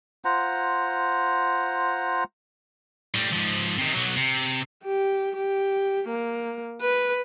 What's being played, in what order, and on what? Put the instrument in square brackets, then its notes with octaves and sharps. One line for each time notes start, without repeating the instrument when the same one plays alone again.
[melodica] F4 C5 F#5 A#5
[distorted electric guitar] A2 G3
G#2 F3
C3 D#3
B1 F#3
C3
[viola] G4
G4
A#3
B4